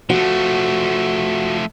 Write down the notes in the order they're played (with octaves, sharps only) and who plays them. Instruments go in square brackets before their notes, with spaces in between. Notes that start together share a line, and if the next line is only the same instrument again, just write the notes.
[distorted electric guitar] F3 A3 [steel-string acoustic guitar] F#4